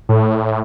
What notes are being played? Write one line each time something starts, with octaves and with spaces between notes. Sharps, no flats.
A2